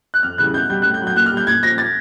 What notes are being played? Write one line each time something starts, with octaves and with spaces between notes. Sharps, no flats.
F#6
F2 F6
C#3 E3 G3 F#6
B2 G6
G3 G6
A2 F#6
G6
F#3
G6
A#2 F#6
F6
G3
G6
A#2 G#6
F3 A#6
A6